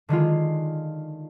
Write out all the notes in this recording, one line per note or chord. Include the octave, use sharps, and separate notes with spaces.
D3 D#3 G#3 F4